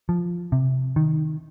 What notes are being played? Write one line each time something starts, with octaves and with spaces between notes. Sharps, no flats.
F3
C3
D#3